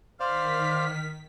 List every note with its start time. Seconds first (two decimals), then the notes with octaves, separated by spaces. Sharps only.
0.20 D#3 C5 D5 F5 F6 B6